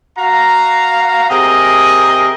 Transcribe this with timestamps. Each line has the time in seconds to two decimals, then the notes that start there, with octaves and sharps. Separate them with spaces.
0.18 F#4 F5 A#5
1.30 C3 G#4 A#4 D#5